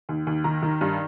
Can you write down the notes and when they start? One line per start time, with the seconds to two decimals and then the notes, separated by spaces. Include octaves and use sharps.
0.09 D#2
0.27 D#2
0.44 D#3 A#5
0.62 D#3
0.81 G2